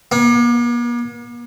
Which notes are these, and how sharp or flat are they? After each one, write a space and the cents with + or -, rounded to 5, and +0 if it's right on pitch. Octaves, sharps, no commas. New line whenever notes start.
A#3 +45